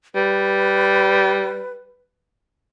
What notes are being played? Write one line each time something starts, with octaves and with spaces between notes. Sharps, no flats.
G3 B4